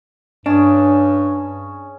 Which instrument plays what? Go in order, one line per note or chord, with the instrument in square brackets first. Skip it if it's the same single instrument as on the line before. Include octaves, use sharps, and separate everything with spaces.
[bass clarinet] G2 [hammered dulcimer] C#4 G#4 [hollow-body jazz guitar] D4